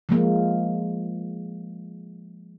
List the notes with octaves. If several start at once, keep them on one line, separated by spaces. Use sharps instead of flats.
F3 G#3 A#3